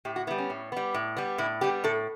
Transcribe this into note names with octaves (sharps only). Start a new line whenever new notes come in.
A2 G4
F#4
G3 B3 E4
C#4
A2
G3 B3
A2
G3 B3
A2 E4
G3 B3 G4
A2 A4